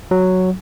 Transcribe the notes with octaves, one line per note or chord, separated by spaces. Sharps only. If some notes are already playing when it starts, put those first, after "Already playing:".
F#3